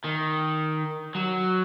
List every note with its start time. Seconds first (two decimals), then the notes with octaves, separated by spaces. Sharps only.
0.04 D#3
1.15 F#3